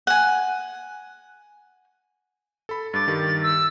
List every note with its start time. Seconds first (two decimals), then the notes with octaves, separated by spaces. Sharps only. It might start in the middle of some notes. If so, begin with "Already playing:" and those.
0.07 F#5 G#5
2.69 A4 B5
2.94 G2 D6 A6
3.08 G2 D#3 G4
3.43 E6